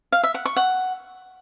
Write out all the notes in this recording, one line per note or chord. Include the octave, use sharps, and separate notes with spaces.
F5
E5
F#5
C#6
F#5